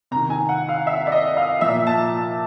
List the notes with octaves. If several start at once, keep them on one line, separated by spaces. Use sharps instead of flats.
C3 D#3 A#5
G#5
F#5
F5
E5
D5
D#5
F5
A#2 F3 E5
A5